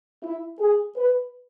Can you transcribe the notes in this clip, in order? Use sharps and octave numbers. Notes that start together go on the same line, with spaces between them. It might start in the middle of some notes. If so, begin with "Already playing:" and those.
E4
G#4
B4